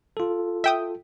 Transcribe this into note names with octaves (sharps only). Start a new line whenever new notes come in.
F4 A4
E5 G5 D#6